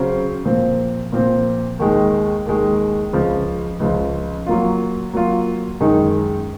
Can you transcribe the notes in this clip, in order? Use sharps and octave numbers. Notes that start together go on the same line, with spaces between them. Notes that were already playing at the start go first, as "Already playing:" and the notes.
Already playing: C#3 F#3 C4 F#4 C5
A#2 F3 C4
A#2 F3 C4
D#2 D#3 G#3
D#2 D#3 G#3
C#2 C#3 F3
C#2 C#3 F3
F#3 A#3 F4
F#3 A#3 F4
F#2 D#3 G#3 D#4